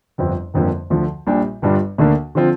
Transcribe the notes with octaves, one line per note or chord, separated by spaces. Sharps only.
G1 F2 F3 C4
G1 F2 D3 F3 A#3
D2 D3 F3
A#1 A#2 G3 D4 G4
G1 G2 G3 D4 F4
D2 D3 A#3 D4
D3 F3 C4 F4